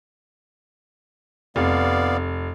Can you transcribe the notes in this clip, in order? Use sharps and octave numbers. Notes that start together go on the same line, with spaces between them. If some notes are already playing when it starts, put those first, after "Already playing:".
F1 B3 D5 F5